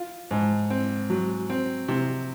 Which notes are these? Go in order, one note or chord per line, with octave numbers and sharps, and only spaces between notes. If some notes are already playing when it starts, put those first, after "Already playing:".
Already playing: F4
G#2
C4
F#3
C4
C3